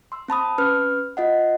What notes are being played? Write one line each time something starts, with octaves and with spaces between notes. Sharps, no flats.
C6 E6
C4 A5 B5 D#6
C#4 B4 F6
F4 D#5 F#5